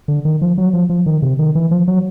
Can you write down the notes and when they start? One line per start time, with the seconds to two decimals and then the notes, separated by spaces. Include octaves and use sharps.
0.08 D3
0.25 D#3
0.41 F3
0.58 F#3
0.73 F3
0.89 F3
1.06 D#3
1.22 C3
1.39 D#3
1.55 E3
1.71 F3
1.88 F#3